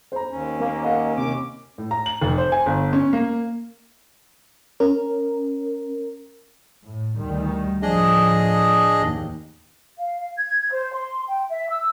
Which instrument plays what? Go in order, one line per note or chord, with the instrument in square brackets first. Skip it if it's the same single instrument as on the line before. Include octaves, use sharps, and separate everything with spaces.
[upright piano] C5 A#5
[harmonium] D#2 C#4
[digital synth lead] A#3
[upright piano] D#5 F5 F#5
[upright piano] C3 [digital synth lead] D6
[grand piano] A2
A#5
F#7
F1
C5
G#5
G1
C#4
A#3
[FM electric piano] C#4 A#4
[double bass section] A2
D2 D#3 G3
[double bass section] D2 A2 F3 [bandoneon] D4 G#4 D#5
[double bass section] D#2
[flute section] F5
G#6
C5
C6
G5
E5
E6